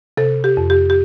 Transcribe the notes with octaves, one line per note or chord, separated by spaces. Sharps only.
C3 A4
G4
F2
G4
G4